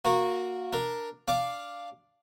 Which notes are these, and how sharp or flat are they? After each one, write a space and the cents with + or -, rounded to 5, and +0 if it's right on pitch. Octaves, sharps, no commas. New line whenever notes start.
A#3 +0 F#4 -20 A#4 +0
D4 +5 A#4 +0
D4 -5 F5 +0 D6 +0